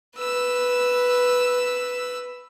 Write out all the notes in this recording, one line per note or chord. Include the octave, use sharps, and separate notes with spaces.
B4 E6